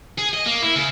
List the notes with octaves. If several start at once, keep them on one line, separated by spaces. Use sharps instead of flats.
G#4
D#5
A#3
E4
C#3